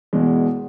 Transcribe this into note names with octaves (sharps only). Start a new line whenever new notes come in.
E1 E2 B2 G#3